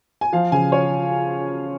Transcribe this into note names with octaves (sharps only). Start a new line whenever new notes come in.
G#5
F3 F5
C#3 G#5
C#5